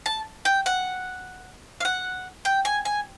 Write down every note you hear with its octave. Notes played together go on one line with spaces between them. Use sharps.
A5
G5
F#5
F5
F#5
G5
G#5
G#5